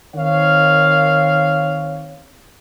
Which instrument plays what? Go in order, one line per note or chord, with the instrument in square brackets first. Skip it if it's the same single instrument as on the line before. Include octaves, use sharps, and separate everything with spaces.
[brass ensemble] D#3 C4 C#5 F5